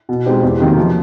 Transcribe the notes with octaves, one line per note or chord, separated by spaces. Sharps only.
B2
G#3 C4 D#4 G4
E2
C3 D#3 F#3 A#3
F3